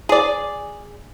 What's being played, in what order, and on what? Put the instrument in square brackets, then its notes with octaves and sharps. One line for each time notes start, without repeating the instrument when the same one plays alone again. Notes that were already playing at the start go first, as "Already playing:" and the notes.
[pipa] G#4 D5